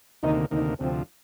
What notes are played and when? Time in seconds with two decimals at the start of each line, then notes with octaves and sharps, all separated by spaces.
0.23 D2 C3 D#3 A#3 D#4
0.51 D2 C3 D#3 A#3 D#4
0.80 D2 C3 F3 C4